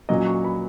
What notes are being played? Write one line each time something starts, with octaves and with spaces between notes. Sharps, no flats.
A#2 F#3 C#4 D#5
C#6
B5